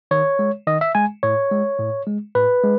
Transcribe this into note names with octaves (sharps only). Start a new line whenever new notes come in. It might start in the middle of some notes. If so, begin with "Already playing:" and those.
D#3 C#5
G#3
D#3 D#5
E5
G#3 G#5
A2 C#5
G#3
A2
G#3
A2 B4
G#3